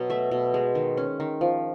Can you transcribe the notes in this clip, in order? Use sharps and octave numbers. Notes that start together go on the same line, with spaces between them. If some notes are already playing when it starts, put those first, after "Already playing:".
Already playing: B2 F#3
A3 E5
B2
G#3
D#3
C#4
D#3
F3